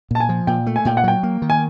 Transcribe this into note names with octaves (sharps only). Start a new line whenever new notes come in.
A#2 A5
G#5
F3
A#2 G5
A3
G#5
A#2 G5
F#5
F#3 G5
A#3
D#3
G#5